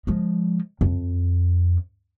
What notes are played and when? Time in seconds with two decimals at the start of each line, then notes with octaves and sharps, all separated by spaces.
0.07 F3 G#3
0.81 F2